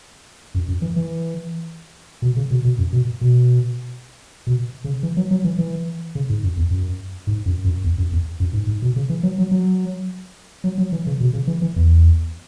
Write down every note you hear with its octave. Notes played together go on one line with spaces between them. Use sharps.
F#2
F#2
E3
E3
B2
C#3
B2
B2
F#2
B2
B2
B2
C#3
E3
F#3
F#3
E3
E3
C#3
G#2
F#2
E2
F#2
G#2
F#2
F#2
E2
F#2
E2
F#2
G#2
G#2
B2
C#3
E3
F#3
F#3
F#3
F#3
F#3
E3
C#3
B2
C#3
E3
E3
E2